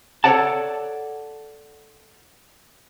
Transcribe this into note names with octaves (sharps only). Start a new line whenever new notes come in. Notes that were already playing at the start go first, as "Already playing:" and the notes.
A4 A#4 C#5 D5 F#5 A5